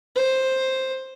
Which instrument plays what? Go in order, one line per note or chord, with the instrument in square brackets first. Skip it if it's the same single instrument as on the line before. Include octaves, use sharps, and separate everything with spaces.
[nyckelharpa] C5